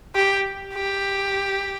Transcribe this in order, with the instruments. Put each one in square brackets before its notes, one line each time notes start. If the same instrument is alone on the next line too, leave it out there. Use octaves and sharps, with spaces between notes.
[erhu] G4
G4